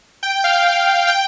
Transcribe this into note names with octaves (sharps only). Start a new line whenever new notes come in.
G5
F5
G5